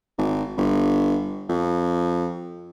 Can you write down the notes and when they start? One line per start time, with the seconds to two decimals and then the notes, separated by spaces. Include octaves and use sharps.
0.18 G#1
0.57 G1
1.49 F2